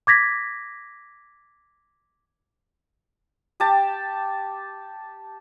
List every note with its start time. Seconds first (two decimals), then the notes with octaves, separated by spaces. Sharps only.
0.07 D6 G#6 A#6 B6
3.60 G4 A5